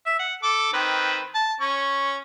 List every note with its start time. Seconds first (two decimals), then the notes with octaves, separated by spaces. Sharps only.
0.06 E5
0.19 F#5
0.43 A4 D6
0.73 D#3 C4 B4
1.35 A5
1.61 C#4 C#6